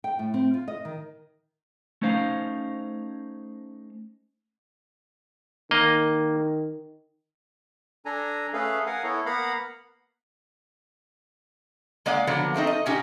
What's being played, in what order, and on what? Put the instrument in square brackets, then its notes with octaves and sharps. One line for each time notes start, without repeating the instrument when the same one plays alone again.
[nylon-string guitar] G5
A2
C4
F4
D#5
D#3
[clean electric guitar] A3 C#4 D#4 C5 F5
[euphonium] D#3 [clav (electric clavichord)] A#3 D#5
[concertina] D4 A4 G#5 A#5
A3 C#4 G#4 A4 B4 F5
A#4 F5 F#5 G#5
B3 E4 A4 C#5
A#3 B3 F5 F#5 A#5 B5
[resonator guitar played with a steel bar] G#3 A#3 D5 F5 F#5
D3 F3 F#3 A#3 B3
F3 A3 C4 D#4
D#5
A#2 C#4 D#4 G4